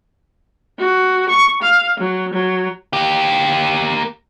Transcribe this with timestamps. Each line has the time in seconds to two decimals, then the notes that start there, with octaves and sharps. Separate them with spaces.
0.79 F#4
1.29 C#6
1.62 F5
1.99 F#3
2.33 F#3
2.93 A#3 G4